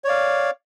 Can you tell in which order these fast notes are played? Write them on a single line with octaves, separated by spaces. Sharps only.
C#5 D5 F5